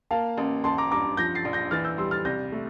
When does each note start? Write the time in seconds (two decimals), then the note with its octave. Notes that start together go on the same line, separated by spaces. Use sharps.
0.11 A#3 F5 A5
0.38 A1
0.64 A1 A5 C6
0.78 A#5 D6
0.91 G2 A#5 D6
1.17 F3 G6 A#6
1.35 A6 C7
1.45 A#1
1.53 G6 A#6
1.71 E3 F6 A6
1.84 E6 G6
1.98 G3 C6 E6
2.11 F6 A6
2.25 C2 G6 A#6
2.52 A3